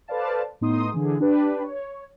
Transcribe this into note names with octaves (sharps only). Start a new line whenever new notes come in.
A4 B4 C5 D5 F5 A5
A2 B3 D#4 C6 D#6
D3 E3 G#4
D4 G4 B4
C#5